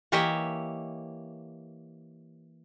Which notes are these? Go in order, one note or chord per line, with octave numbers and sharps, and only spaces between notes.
E3 A#3 G4 C#5 D#5 E5